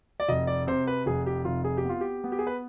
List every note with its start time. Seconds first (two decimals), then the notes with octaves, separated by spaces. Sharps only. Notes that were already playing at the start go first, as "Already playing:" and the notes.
0.20 D5
0.28 F1 D#5
0.47 D5
0.67 C3 C5
0.87 B4
1.06 F1 G#4
1.26 G4
1.45 F1 F4
1.64 G#4
1.77 G4
1.84 B3
1.89 F4
2.01 G4
2.24 B3
2.32 G4
2.39 G#4
2.47 B4